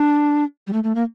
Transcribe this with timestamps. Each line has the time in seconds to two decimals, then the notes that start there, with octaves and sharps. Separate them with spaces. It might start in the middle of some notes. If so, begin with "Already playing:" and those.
Already playing: D4
0.67 G3
0.73 A3
0.84 A3
0.95 A#3